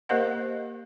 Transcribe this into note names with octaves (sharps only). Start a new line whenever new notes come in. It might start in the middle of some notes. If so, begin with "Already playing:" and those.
A#3 G4 A#4 C5 D#5 F#5